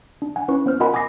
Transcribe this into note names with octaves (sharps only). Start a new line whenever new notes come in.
D4
F#5 G#5
C#4 E4 B4 C#6
B3 C5 F6
F4 A#4 D#5 F#5 G#5 B5
G#5 D6 D#6 A#6 C7